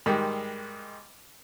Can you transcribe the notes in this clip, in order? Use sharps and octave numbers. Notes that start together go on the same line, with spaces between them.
G#2 D#3 G3 G#3